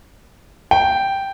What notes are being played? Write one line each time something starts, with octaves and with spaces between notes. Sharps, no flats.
G5